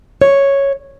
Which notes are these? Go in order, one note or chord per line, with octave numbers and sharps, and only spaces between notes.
C#5